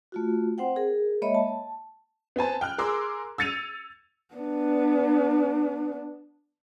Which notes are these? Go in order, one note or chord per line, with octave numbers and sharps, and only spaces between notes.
A3 F4 F#4
C4 C5 F#5 G5
G#4 A#4
G#3 A#3 C#5 D#5 E5 B5
A5
B3 C4 G#5 A5
G5 F6 F#6
G#4 A#4 C6 D6 E6
E6 G#6 A6 C#7 D#7 F7
B3 D4